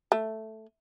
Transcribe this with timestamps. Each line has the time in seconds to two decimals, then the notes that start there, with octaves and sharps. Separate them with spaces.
0.12 A3